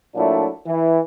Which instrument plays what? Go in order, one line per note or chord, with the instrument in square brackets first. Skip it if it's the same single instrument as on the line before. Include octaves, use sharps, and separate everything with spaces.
[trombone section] A#2 F#3 A3 D4 E4
E3